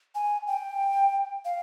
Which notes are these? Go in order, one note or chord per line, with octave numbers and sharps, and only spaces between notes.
G#5
G5
F5